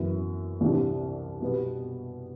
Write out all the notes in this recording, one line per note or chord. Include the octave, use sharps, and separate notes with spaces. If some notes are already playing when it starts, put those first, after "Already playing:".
Already playing: F#2 E3 B3 E4
C2 C3 E3 G3 D4
B2 G3 B3